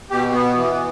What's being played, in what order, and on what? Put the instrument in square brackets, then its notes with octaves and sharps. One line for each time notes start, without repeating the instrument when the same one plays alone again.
[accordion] B2 G4
B3
E3